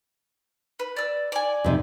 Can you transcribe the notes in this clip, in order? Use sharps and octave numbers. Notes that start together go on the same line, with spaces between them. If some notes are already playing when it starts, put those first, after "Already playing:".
B4
D5 E6
D5 G#5
F2 C3 D#4